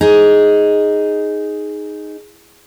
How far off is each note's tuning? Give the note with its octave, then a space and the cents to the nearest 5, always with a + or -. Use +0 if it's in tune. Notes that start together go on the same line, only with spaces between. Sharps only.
D#4 +0 G#4 +0